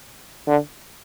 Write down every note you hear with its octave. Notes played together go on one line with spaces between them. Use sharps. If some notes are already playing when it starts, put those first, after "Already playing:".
D3